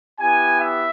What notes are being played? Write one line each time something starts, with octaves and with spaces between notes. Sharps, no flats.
B3 E4 G4 G#5
E5